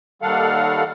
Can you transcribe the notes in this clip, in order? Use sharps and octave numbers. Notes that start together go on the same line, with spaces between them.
D#2 D#3 G3 A4 F5 F#5